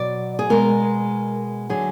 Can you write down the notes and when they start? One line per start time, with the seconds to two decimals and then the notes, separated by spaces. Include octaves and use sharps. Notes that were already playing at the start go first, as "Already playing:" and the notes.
Already playing: B2 F#3 D5
0.39 G#4
0.50 B2 G#3 A#4
1.69 D3 F#3 G#4